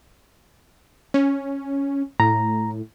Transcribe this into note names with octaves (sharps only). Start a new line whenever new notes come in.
C#4
A2 A#5